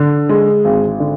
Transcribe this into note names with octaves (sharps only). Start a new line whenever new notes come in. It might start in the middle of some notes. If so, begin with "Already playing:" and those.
Already playing: D3
G#3
G#1
D3